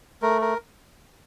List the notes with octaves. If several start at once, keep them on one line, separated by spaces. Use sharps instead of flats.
A3 A#4
A#4